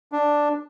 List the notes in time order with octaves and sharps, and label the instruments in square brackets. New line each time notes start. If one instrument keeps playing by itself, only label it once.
[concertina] D4